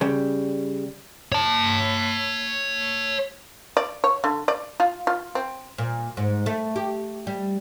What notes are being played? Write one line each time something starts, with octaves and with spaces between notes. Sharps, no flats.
C#3 G3
C#5 A5
D5
C#5
D3
D5
F4
F4
C4
A#2
G#2
A3
G4
G3